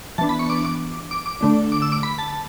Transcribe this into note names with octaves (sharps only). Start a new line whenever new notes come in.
E3 B3 D4 A5
B5
C#6
D6
D6
D6
D6
D3 A3 D4
D6
E6
D6
B5
A5